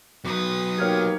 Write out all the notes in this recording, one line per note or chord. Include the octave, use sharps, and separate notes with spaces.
F#3 B3 B4 D#6
A#3 D#4 G4 C#5 F6 G#6